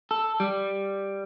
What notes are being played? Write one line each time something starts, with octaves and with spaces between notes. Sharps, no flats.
A4
G3